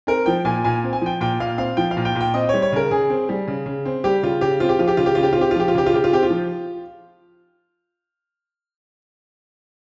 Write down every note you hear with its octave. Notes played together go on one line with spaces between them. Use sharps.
C4 A#4
F3 G5
A#2 G#5
A#2 G#5
C4
G#5
F3 G5
A#2 G5
A#2 F5
C4 F5
F3 G5
F5
A#2
G5
A#2
G5
C4 D#5
C#5
G3
C#5
C#3 A#4
C#3 G#4
C4
G3
C#3
C#3
C4
G3 G4
C#3 F4
C#3 G4
C4 F4
G4
F3 F4
G4
C#3 F4
G4
C#3 F4
G4
C4 F4
G4
F4
F3 G4
F4
C#3 G4
F4
C#3 G4
F4
C4 G4
F4
F3